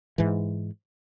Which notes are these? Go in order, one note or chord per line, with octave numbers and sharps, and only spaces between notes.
G#2 E3